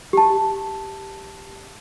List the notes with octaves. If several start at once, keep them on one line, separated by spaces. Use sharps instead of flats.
G4 A5